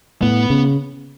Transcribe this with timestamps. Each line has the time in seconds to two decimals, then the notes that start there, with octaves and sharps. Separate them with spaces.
0.22 A2 B3
0.50 C#3